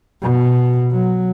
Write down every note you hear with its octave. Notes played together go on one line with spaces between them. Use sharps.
B2
F#3